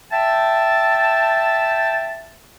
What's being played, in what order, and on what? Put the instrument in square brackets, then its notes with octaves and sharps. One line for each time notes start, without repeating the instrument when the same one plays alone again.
[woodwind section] E5 G5 A5